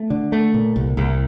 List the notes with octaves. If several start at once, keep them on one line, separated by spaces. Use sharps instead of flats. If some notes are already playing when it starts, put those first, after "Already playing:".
Already playing: A3
D3
A3
A#2
C2
C2